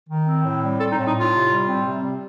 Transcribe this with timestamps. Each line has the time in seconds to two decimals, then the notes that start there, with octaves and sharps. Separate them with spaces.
0.09 D#3
0.26 C4
0.44 A2
0.62 G3
0.79 C4 A4
0.92 D#4
0.97 A2
1.06 D#4
1.14 A2 F4
1.32 C3
1.50 G3
1.67 C4
1.85 C3
2.02 G3